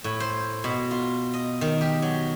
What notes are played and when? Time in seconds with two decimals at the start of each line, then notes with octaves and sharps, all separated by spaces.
0.04 A2
0.20 C5
0.64 B2
0.91 F4
1.34 D#5
1.61 D#3
1.81 G4
2.02 F#3